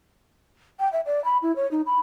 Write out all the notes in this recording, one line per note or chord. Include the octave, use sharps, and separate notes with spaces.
G5
E5
D5
B5
E4
C#5
D#4
B5